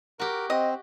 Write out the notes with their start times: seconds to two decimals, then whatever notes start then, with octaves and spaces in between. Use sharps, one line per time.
0.20 F#4 G4 A#4
0.50 C4 D#5